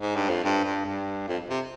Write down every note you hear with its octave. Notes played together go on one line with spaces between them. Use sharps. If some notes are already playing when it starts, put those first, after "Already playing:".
G#2
G2
F2
G2
G2
G2
F2
C3